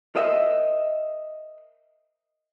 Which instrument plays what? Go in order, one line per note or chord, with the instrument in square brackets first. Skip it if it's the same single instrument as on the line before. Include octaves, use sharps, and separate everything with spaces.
[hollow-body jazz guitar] A#4 C5 D#5 E5 F#5